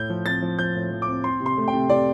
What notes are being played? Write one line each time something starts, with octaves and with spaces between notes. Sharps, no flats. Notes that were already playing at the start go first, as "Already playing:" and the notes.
Already playing: A2 G6
F3
C4 A6
F3
F3 G6
A2
F3
D6
C4
C4 C6
C3
C6
A3
G5
C3
C3 D5